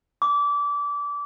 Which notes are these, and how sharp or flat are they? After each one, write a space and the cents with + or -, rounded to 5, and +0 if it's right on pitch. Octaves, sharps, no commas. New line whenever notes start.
D6 -25